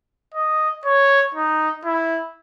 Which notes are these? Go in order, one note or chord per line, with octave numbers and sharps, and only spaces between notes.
D#5
C#5
D#4
E4